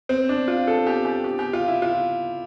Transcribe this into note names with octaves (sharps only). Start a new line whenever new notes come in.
C4
D4
F4
A4
G4
G4
G4
G4
F4
E4
F4